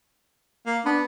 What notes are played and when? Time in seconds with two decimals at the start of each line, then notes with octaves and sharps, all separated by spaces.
0.66 A#3
0.86 B3 D4